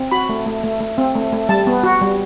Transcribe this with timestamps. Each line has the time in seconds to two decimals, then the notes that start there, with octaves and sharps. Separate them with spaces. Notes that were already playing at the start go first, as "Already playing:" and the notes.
Already playing: C4
0.11 F#4 B5
0.29 A3
0.46 A3
0.64 A3
0.81 A3
0.98 C4
1.15 A3
1.32 A3
1.49 G3 A5
1.67 B3
1.83 F#4
2.01 G3